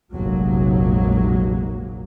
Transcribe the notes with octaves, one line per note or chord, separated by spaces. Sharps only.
F1 A#1 A#2 F#3 G#3 A#3